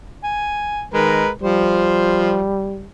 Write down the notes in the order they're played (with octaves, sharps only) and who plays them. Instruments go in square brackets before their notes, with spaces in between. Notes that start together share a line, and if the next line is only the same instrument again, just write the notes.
[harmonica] G#5
[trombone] D#3 [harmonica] G#3 A#4 B4
[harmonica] F3 C5 [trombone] G3